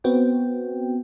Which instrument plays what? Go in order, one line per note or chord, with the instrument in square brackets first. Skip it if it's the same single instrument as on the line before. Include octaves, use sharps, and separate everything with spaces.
[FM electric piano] B3 C4 F#4 G5